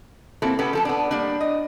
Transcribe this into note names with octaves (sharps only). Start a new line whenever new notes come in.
A#3 C4 E4 F#4 A4
B3 C#4 G4 A4 B4
F3 A4 A5
B3 D4
G3 A#3 D4
D#5